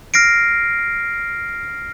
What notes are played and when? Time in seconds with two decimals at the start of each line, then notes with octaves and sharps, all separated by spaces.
0.14 F6 A#6 C7 D7